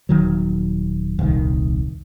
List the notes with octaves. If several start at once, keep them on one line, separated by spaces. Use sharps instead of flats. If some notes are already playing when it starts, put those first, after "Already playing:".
D#1 D#3 F#3
D#1 C2 D#3